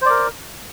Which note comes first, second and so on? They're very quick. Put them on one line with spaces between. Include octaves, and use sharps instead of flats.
C5 D5 A#4